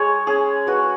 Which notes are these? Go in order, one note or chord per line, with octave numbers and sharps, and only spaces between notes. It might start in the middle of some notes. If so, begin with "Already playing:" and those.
Already playing: G#3 G#4 C#5
C#4 G#4
G#3 F#4 B4